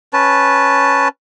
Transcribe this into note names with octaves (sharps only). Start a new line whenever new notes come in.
C#4 B4 A5